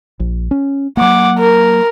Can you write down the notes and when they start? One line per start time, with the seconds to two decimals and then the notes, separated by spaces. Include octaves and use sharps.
0.20 A#1
0.51 C#4
0.97 F#3 A#3 F#5 D6
1.38 A#4